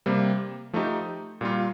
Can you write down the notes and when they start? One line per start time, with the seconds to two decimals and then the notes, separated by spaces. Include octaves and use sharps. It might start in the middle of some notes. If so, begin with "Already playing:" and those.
0.06 C3 G3 A#3
0.73 F3 A3 D#4 G4
1.41 A#2 G3 A#3 F4